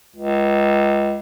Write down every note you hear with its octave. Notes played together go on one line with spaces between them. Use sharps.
C#2